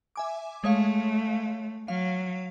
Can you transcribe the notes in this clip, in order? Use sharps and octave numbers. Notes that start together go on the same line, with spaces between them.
E5 G#5 D6
G#3 A3 C#5 F5
F#3 F5